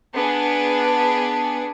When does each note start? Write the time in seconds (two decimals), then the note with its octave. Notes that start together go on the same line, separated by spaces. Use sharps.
0.14 B3 D4 G#4